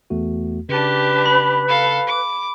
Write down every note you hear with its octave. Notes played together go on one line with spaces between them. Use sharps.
E2 A3 F#4
C#3 D4 G4 B4 A5
B5
A4 F5
D6